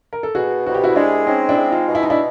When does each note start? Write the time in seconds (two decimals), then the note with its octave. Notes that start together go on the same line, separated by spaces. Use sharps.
0.13 A#4
0.23 A4
0.35 B2 F#4 G#4
0.66 C2 F#4
0.75 G4
0.84 E4 F#4
0.96 G#3 D4 E4
1.27 C4 C#4 D#4
1.49 D4 E4
1.57 G#3
1.72 D#4 F4
1.87 B2
1.95 E4
2.03 D#4
2.10 D4 E4